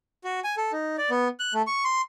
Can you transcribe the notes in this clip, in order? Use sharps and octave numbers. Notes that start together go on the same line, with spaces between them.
F#4
G#5
A4
D#4
D5
B3
F#6
A3
C#6
C6